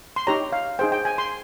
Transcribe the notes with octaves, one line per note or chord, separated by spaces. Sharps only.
C6
D#4 G4 C#5 A#5
F5
D#4 G#4 C5 G5
G5
G#5
C6